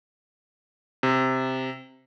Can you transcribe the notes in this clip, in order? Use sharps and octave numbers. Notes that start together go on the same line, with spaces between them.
C3